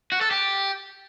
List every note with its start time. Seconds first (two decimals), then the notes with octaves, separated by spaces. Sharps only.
0.12 F#4
0.21 A4
0.31 G4